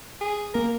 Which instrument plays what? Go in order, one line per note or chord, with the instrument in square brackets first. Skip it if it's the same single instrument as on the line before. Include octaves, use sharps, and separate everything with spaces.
[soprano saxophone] G#4
[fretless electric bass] A#3 [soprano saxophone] A#4